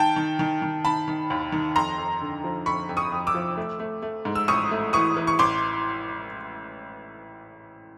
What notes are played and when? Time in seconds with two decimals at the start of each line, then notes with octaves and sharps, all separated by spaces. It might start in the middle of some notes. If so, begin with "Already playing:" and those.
Already playing: D#3 G5 A5
0.16 D#3
0.39 D#3
0.62 D#3
0.85 D#3 A5 B5
1.08 D#3
1.30 D#2
1.52 D#3
1.76 F2 A#5 C6
1.98 F2
2.21 D3
2.44 F3
2.66 F2 B5 C#6
2.89 F2
2.97 C#6 D#6
3.12 F2
3.27 D6 E6
3.35 F3
3.57 A3
3.79 A3
4.03 A3
4.25 G#2
4.35 E6
4.48 A1 C#6 D#6
4.71 A3
4.93 E3 C#6 D#6
5.16 E3
5.27 C#6
5.39 A1 C6 D6